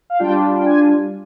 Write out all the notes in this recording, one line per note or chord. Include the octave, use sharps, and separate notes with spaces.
F5
G3 D4 F4 G5
G5
G#5